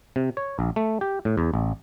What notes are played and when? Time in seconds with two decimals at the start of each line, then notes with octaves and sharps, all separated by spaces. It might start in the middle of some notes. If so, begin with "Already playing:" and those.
0.16 C3
0.37 C#5
0.59 A#1
0.76 A3
1.01 G4
1.25 A2
1.37 E2
1.54 A1